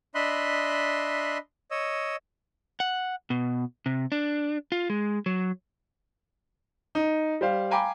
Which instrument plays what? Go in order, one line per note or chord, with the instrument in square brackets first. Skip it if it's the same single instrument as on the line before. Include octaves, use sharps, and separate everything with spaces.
[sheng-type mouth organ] D4 D#5 E5 B5 C6 F#6
C#5 D#5 E6
[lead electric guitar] F#5
B2
C3
D4
F4
G#3
F#3
[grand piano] D#4
G3 C5 F5
F5 G5 G#5 A#5 B5 D6